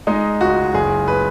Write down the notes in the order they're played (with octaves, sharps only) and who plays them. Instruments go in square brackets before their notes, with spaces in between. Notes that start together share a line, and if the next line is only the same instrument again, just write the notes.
[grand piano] G#3 D#4
C#2 F#4
F#1 G#4
B4